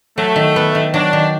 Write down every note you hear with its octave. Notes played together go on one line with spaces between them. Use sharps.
F#3 A3
D#3
B3
D#3
F#3 D4
D#3